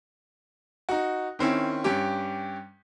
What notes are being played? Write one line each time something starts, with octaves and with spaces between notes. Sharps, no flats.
D#4 F#4
D#3 C4 C#4 E4
G2 C#4 G4